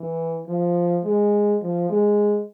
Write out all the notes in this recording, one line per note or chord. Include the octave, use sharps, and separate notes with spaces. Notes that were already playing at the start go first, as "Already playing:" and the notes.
Already playing: E3
F3
G#3
F3
G#3